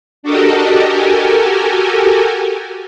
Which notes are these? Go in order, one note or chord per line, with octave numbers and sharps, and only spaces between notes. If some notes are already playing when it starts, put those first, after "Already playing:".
D4 F#4 G4 A4 A#4 D#5
F#4 G4 A4 A#4 G#5